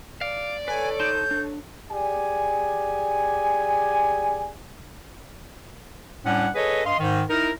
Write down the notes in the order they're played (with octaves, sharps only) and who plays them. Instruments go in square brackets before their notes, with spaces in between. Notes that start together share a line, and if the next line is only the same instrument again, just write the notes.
[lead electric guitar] D5 [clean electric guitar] F5
[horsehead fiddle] A4 C#5 [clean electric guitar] B4 [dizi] G#5
[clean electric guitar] D#4 A5 C6 [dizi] G6
[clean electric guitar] D4
[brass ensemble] G4 G#4 D5 G#5
[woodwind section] A2 G3 C#4 D4 F#5
G#4 A4 B4 C#5 D#5
G2 D#5 F5 C6
G#2 D#3
D#4 E4 A#4